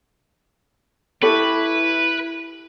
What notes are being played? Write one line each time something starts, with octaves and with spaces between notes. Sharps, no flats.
E4 G4 A4 B4 C#5